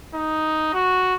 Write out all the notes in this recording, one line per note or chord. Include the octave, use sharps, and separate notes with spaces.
D#4
F#4